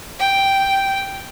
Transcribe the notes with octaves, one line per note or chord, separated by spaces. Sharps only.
G5